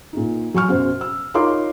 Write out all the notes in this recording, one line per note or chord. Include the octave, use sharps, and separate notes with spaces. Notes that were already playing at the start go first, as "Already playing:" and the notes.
A#2 D#4
F#3 G#5 C#6 F6
F#2 B2 C5
E6
D#4 F4 A#4 C#5 C6 D6